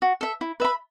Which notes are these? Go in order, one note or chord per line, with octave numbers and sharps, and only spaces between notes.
F#4
A4 E5
E4
B4 E5 B5